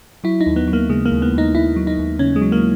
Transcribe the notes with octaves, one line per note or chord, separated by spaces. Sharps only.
F#3 E4
D#4
D#2
B3
F#3
A#3
C#3 G#3
A#3
D#2
B3
D#2 D#4
D#2 E4
F#3
D#4
D#2
C#3 C#4
G#3
F#3
A#3